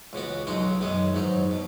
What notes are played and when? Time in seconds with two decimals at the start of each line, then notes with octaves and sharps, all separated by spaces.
0.13 C#2 C#3 B3 F#4
0.47 B1 B2 G#3 D#4 F#4
0.81 F#2 D#3 G#3 B3
1.15 G#2 F#3 D#4
1.51 B2